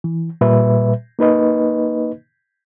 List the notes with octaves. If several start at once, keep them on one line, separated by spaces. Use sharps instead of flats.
E3
A#2 G3 B4 E5
A#3 D#4 B4 D#5